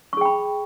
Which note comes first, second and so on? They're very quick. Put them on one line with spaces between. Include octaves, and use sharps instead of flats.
C#6 G#4 G5 B5